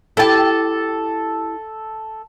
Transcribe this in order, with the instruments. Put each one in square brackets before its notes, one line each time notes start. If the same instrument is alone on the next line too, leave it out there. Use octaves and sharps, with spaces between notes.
[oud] E4 G4 [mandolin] A4 A5